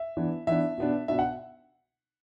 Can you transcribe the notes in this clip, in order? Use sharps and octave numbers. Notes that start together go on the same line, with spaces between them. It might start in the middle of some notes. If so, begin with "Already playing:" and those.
Already playing: E5
E3 B3 D4
E3 B3 D4 E5
B2 B3 D4
B2 B3 D4 E5
F#5